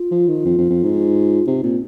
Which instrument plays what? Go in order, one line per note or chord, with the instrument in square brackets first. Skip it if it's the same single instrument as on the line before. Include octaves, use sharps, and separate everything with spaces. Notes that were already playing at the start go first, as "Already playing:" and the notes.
Already playing: [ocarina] F4
[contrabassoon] F3
D#3
F2
F2
F2
G#2
[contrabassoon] C3 [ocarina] D#4
[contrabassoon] A#2 [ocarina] C4